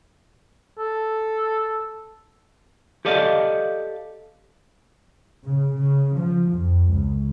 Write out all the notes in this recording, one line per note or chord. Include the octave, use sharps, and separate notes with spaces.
A4
G4 A4 D5 D#5 F5
C#3
C#3
F3
F2
C#2